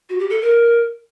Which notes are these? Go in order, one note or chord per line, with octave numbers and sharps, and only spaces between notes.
F#4
G4
A4
A#4